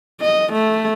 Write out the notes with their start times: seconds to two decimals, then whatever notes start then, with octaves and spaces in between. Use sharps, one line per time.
0.21 D#5
0.53 A3